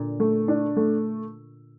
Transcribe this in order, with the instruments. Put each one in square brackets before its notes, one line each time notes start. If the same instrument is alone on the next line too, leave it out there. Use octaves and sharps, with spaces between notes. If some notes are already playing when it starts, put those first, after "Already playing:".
Already playing: [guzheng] A#2 D3
[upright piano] A3
D4
A3